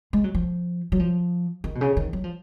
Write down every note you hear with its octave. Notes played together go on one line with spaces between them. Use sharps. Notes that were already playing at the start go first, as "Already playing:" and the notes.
G#3
F#3
F3
F#3
F3
D#3
B2
C#3
D#3
F#3
F3